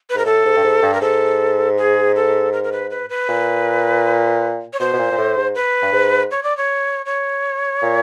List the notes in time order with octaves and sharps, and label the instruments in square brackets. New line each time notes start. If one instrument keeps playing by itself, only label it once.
[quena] B4
[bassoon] G#2 [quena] A#4
[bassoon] A2 [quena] A4
[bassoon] G#2
G2
G#2
G2
[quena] A#4
[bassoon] G#2 [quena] A4
[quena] G#4
A4
A#4
A#4
B4
B4
B4
[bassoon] A#2
[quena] C#5
[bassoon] B2 [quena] C5
[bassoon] B2
A#2
A#2
A2
G#2
[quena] B4
[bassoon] G2
G#2
[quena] C#5
D5
C#5
C#5
[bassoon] A#2